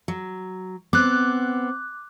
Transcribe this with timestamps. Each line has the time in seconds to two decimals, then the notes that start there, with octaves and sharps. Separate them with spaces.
0.08 F#3
0.93 B3 C4 D6 F#6